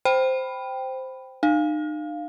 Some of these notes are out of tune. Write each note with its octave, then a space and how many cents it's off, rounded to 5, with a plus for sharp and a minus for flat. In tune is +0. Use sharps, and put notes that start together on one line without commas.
C5 -5 G5 +0 B5 +5
D#4 -40 F5 +0